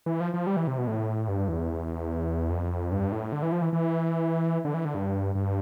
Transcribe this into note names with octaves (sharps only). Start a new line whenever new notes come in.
E3
F3
F3
G3
E3
C3
B2
A2
G2
E2
F2
G2
A2
D3
E3
F3
E3
E3
D3
E3
D3
G2
G2